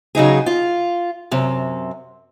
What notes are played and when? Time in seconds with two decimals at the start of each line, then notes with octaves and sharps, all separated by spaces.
0.15 C#3 F#3 D#4 G#4
0.46 F4
1.31 F#2 C3